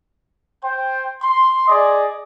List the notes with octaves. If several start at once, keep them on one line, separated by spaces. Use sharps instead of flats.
C5 G5
C6
G#4 D5 D#5